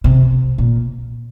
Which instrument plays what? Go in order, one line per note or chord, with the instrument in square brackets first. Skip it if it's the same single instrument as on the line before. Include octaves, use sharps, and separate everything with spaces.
[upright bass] C3
A#2